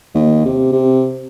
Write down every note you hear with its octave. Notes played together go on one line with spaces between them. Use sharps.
D#2
C3
C3